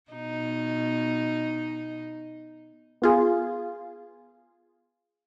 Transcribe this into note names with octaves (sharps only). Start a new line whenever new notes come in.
B2 D#4
B3 F4 G#4